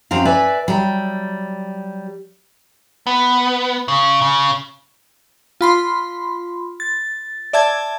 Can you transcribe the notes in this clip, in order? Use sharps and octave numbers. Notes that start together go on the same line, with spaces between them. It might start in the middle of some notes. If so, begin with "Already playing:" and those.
F#2 F#3 C4 F5
B4 D5 E5 G#5
F#3 G3
B3
C#3
C#3
F4 B5 C6
A6
D5 E5 A5 G#6